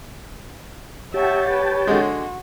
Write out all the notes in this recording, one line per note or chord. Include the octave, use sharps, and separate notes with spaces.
G4 C#5 E5 F#5 G5 A5
B4
D3 G#3 F#4